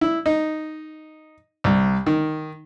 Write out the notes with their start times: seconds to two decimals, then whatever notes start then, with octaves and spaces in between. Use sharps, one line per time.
0.01 E4
0.26 D#4
1.64 C2
2.06 D#3